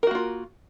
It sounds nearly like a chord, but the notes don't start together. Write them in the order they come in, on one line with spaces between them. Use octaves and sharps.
A#4 F#4 A#3 F4